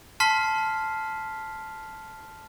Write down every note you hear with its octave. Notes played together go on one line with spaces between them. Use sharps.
A5 C6 F6 B6 C7